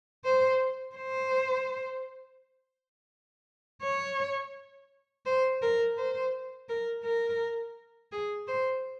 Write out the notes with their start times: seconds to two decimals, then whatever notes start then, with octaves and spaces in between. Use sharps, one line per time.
0.25 C5
0.96 C5
3.82 C#5
5.26 C5
5.62 A#4
5.98 C5
6.69 A#4
7.04 A#4
8.12 G#4
8.48 C5